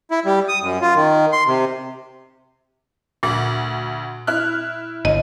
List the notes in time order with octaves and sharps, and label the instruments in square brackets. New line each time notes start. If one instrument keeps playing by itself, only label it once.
[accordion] E4
G3
D#6
F#2
F4
D#3
C6
C3
[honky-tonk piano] D2 [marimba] A#2
[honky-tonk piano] E4 F6 F#6
[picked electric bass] G1 [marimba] D#5